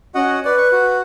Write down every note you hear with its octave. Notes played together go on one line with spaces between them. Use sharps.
C#4 F#4 D#5 F#5
B4 D5
C#6
F#4